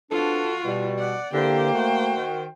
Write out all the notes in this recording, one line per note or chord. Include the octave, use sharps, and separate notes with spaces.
B3 C4 D4 F4 F#4 A4
B2 G3
D5 F#5
C2 D3 E3 A#3 G4 C5 G5
A3 F#4
D#3